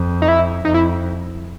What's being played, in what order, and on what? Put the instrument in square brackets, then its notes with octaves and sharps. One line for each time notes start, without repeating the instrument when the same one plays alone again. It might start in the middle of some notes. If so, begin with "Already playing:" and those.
Already playing: [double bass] F2
[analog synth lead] D#4
E4
[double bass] F2 [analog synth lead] D#4
[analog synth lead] E4